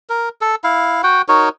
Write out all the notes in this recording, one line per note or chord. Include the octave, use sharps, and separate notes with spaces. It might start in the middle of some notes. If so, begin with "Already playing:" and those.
A#4
A4
E4 F5
F#4 F#5 G5
D#4 F#4 A#4 C#5